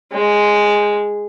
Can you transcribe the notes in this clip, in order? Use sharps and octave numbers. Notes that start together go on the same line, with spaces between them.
G#3